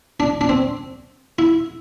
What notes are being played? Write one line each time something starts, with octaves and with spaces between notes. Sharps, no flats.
D4
D4
C4
E4